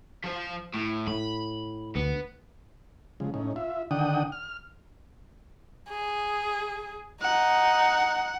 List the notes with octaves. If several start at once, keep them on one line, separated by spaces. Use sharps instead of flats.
F3 C5
A2
A2 B5
D2 B3
C#3 F3 G#3
A2 C#4 D#4
F4 E5
D3 D#3 D4 F#5 G5 D#6
F6
G#4
D#4 F#5